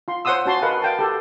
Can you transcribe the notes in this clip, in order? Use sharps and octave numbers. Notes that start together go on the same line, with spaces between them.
F4 C6
C5 C#5 F#5 C6 D#6 E6
C#4 F#4 A5 C6
A#4 B4 D#5 F5 F#5
F5 G5 A5
G4 A4